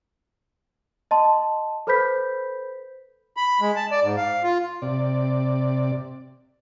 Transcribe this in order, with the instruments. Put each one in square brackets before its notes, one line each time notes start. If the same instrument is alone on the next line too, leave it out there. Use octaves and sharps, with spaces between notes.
[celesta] D#5 A5 C6
A4 B4 C5 B5 G6 B6
[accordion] B5
G#3
A5
D5
G#2
F5
F4
[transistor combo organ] C3 D5